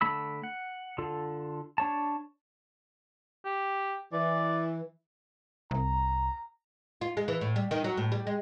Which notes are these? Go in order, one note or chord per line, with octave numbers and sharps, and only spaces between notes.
D3 A3 B5 E6
F#5
D3 F4 A4
D4 C#5 A5
G4
E3 D5
C2 A#5
F4
G#3
E3
A2
G3
D#3
F#3
A2
G3
G#3